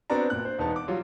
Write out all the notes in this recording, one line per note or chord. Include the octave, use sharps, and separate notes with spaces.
B3 C4 D4 F#4 D5 A#5
G1 A#2 F#6
C5
E1 B3 D#4 A5
D6
F#3 G3 F4